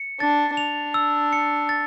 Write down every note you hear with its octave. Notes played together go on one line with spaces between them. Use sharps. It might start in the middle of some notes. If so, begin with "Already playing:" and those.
Already playing: C#7
D4 A6
D4 F7
E6
C#7
A6